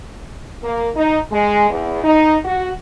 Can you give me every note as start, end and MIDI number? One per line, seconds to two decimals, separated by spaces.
0.63 0.88 58
0.95 1.19 63
1.32 1.69 56
1.70 2.04 40
2.04 2.36 63
2.45 2.70 66